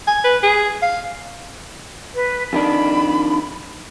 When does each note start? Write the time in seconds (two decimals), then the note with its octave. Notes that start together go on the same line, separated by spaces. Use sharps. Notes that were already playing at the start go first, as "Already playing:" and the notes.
0.07 G#5
0.24 B4
0.43 G#4
0.82 F5
2.15 B4
2.53 F2 D#3 D4 B5